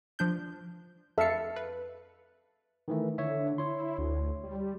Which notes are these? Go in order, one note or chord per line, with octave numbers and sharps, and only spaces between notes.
F3 D4 G6
F2 A4 E5 F5 C#7
B4
D#3 E3 A3
D3 C#5 E5
E4 C#5 C6
D2
G3